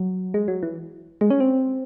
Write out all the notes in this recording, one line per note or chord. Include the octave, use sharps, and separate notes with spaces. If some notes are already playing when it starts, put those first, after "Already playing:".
Already playing: F#3
G#3
F#3
E3
G#3
C#4
C4